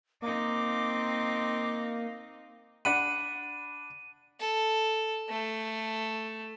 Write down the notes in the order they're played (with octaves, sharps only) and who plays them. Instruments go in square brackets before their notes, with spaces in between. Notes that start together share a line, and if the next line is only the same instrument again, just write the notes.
[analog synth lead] A#3 [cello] C4 D#4 [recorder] D6
[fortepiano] D4 F#5 B5 [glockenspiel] D#7
[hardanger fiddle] A4
A3